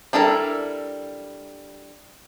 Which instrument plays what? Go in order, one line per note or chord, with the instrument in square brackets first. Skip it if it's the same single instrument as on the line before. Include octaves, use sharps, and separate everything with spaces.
[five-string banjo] G3 D4 E4 A4 A#4